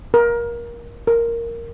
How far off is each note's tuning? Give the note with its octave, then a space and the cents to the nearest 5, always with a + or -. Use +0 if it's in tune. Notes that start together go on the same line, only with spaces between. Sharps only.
A#4 +20
A#4 -5